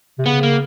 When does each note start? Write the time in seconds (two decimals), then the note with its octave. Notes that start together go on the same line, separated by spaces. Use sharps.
0.19 C3
0.25 C#3 B3
0.43 A#3